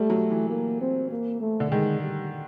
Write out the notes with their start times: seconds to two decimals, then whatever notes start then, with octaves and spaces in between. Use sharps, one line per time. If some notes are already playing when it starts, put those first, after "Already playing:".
Already playing: G3 A3
0.10 F#3
0.31 E3
0.50 A#3
0.81 C4
1.11 A#3
1.41 A3
1.60 D3
1.72 D#3 G#3
2.02 G3